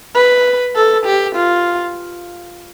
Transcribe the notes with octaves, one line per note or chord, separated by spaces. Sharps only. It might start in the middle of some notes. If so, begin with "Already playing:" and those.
B4
A4
G4
F4